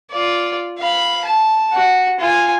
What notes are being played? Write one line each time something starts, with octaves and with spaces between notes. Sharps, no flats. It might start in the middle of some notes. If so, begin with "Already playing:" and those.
F4 D5
F5 B5
A5
F#4
F4 G#5